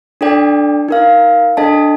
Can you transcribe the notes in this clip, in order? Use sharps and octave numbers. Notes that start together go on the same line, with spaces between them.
D4 A4 D5 G5
D#4 A#4 F5
D4 A4 D#5 A5